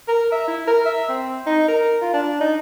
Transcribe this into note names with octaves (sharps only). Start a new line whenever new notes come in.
A#4
E5
E4
A#4
E5
C4
D#4
A#4
F4
D4
D#4